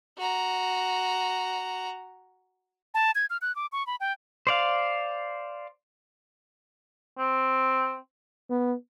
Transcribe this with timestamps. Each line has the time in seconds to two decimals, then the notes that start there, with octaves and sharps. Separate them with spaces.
0.18 F#4 A#5
2.94 A5
3.15 G#6
3.30 F6
3.42 F#6
3.56 D6
3.72 C#6
3.87 B5
4.00 G5
4.47 C5 D5 F5
7.18 C4
8.50 B3